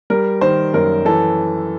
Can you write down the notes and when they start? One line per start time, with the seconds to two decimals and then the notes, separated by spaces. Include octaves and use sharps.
0.10 G3 A#4
0.41 D#3 C5
0.74 F#2 A#4
1.05 E3 A4